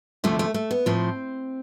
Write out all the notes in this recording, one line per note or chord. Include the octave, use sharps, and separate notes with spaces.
D2 C3 F3 A3
A3
A3
B3
A2 F3 C4